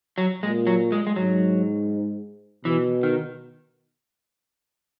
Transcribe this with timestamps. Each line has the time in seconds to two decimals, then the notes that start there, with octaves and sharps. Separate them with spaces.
0.18 F#3
0.43 A#2 G#3
0.67 F#3
0.92 G#3
1.07 G#3
1.16 G#2 F#3
2.65 B2 E3
3.03 D#3